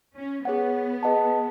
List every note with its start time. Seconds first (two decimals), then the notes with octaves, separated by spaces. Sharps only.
0.16 C#4
0.45 B3 G#4 C#5 F#5
1.03 G#4 B4 D#5 F#5 A5